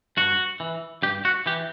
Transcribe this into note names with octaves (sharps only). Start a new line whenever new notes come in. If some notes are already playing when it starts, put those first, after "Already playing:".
G2 F#4
E3
G2 G4
F#4
E3 G4